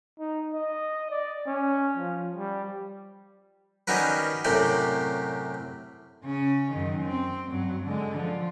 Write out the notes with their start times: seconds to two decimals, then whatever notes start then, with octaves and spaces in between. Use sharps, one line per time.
0.19 D#4
0.53 D#5
1.10 D5
1.47 C#4
1.97 F3
2.36 G3
3.87 D#3 G3 C#4 F#4 A#4 B4
4.45 F#2 A2 C3 G4 D5
6.23 C#3 C#4
6.72 F#2 D#3
7.04 C4
7.51 G2 F#3
7.85 D3 G#3
8.18 F3